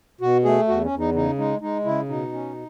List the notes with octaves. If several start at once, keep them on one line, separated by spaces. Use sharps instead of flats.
B2 F#4
A3 G#4
E2 F#4
C#4
E2
D#4
C#3 D#4
G#3 D#4
G#3 D#4
C#3 E4
B2 D#4
C#4